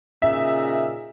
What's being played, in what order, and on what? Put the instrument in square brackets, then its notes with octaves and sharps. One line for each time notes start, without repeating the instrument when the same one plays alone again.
[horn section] A#2 C#3 D#4 [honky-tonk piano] E5